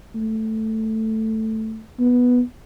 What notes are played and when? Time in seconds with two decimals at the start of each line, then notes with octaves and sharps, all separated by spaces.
0.15 A3
1.99 B3